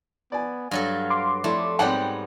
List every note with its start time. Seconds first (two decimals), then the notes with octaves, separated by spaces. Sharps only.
0.32 B3 D5 G#5
0.71 G2 F#3 A4 F5
1.10 C6 D6
1.44 F2 A3 E4 D5 A5
1.79 G#2 G3 B3 C4 C#5 F#5 G5